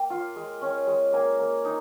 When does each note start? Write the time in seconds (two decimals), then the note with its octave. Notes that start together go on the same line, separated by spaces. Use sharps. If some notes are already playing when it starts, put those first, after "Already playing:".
Already playing: A#3 G5
0.10 F4
0.36 G#3
0.61 C#4
0.87 G#3
1.13 A#3 G#5
1.38 A#3
1.65 D#4